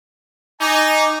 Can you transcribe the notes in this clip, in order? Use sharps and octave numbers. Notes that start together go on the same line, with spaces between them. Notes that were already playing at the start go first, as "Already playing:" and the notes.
D#4 G#5 D6